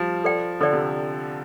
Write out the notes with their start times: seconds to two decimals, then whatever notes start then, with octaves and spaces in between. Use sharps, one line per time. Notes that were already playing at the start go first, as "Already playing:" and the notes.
Already playing: F3 G3
0.24 A4 D5 G5
0.61 D3 A4 D5 G5
0.73 C3